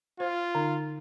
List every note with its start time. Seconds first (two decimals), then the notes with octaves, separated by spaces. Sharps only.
0.20 F4 C5
0.55 D3 D#4